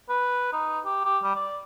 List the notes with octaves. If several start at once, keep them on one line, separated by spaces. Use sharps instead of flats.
B4
D#4
G4
G4
G3
D5